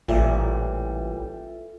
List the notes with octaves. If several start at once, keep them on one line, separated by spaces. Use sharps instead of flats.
A1 A#2 E3 G3 F4 A4 E5